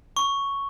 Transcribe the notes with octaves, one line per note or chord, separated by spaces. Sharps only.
C#6